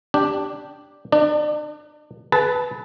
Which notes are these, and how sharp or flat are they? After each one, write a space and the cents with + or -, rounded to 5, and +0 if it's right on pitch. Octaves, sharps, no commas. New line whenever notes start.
D4 +0 G4 +0
D4 +35 D5 +20
G#4 +45 B4 +0 A5 +0